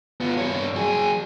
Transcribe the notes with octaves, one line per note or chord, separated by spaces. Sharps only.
B3 F4
G2 C#5
F#3 G#4